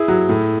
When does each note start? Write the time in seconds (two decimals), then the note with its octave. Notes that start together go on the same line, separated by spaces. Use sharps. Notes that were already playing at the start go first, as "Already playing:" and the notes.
Already playing: E4 G#4
0.08 F#3
0.29 A2